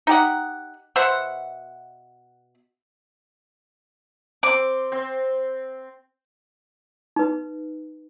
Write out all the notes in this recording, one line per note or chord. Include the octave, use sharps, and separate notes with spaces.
D#4 G4 F#5
B2 C5 E5 F#5
C4 C6 D6
C4
D#4 B4